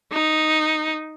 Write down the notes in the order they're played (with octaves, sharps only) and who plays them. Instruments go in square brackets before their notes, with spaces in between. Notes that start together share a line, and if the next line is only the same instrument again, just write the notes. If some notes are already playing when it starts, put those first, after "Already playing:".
[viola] D#4